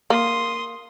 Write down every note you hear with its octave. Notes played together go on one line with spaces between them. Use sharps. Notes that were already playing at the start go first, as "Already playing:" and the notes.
A#3 C6 D#6